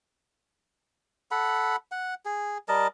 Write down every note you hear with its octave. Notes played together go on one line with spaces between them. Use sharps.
A4 F#5 B5
F#5
G#4
G3 A#4 D#5 A5